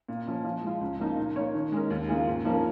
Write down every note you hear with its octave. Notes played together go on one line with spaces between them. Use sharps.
A#2
F3 C#4
F3
G#3 F4
C#2
C#3 F3 A#3 D#4
A#2
A#3 D#4 C#5
D#3
G#3 C#4 A#4
D#2
C#3 A#3 F4 G#4
G#2
F3 A#3 C#4 A#4